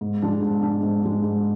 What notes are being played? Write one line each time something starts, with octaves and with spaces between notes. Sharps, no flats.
G#2
G#3 D4
G#2
G#3 D4
G#2
G#3 D4
G#2